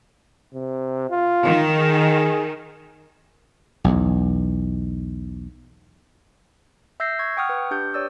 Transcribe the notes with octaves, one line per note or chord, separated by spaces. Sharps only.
C3
F4
D#3
G#4
B1 E2
E5 E6 G6 A#6 C7
C#6 G#6
F#5 G5 C#6 D#6 F6
B4
D4 G4 G6
C#5 D5 E6